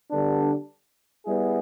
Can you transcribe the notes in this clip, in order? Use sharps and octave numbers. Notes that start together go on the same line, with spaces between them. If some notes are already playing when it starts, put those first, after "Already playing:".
D3 G3 B3 D4
G3 B3 E4 G#4